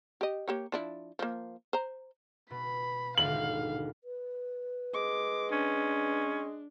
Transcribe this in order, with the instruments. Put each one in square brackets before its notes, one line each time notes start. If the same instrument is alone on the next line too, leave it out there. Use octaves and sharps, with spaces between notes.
[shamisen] G4 D#5
A#3 G4 C#5
F3 D4 E4
F3 A#3
C5 A#5
[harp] B2 [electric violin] B5
[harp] D#1 G#1 D3 [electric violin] F5 [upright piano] F#7
[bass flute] B4
[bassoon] G#3 [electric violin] D6
[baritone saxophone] C#4 [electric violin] D4